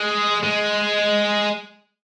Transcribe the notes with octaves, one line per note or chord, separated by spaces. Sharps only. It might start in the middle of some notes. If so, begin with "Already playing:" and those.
Already playing: G#3
G#3